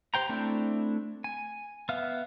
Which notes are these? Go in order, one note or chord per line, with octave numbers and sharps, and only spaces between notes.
G4 C5 G5 A#5
A3 C4 D4 E4
G#5
B3 E5 F5 F6